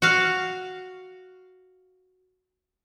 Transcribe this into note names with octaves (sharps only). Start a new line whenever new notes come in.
F#4 F5